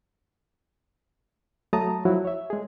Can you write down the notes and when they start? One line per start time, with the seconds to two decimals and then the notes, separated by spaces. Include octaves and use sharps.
1.73 F#3 A3 A5 A#5 D#6
2.05 F3 F#3 E4 F#4
2.25 C#5 E5
2.50 G#3 G#4